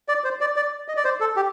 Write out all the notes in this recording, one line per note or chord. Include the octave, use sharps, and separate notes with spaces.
D5
C5
D5
D5
D#5
D5
C5
A4
G4